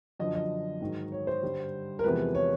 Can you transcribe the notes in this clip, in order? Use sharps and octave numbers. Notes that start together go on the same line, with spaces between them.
F#2 D3 F3 D#5
D#5
G#2 D#3 F#3
C#5
C5
G2 D3 G3
A#4
E2 C3 F3 G#3 B4
C#5